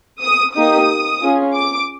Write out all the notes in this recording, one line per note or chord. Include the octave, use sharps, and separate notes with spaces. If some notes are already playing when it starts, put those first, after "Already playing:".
D#6
A#3 D#4 G4 D#6
C#4 F4 G#4
D6